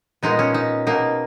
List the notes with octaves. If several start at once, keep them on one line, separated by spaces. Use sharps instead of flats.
A#2 G#3 B3 D#4
C#4
D#4
B2 A#3 D#4